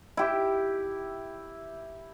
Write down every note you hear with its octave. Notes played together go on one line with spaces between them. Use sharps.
E4 G4